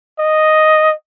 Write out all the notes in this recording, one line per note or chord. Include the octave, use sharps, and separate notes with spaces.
D#5